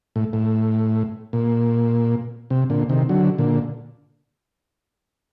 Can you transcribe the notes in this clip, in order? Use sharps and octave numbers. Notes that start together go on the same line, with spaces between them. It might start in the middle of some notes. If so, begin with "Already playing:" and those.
A2
A2
A#2
C3
A#2 D3
C3 D#3
D3 F#3
A#2 D3